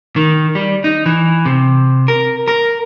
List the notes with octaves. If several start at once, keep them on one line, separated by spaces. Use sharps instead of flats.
D#3
G3
D#4
E3
C3
A#4
A#4